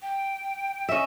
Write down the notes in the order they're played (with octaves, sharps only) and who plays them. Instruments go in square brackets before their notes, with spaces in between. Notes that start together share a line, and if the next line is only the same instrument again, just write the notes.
[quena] G5
[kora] C#4 E5 [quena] D#5